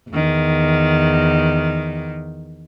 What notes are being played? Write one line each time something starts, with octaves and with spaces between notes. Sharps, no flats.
E2 D#3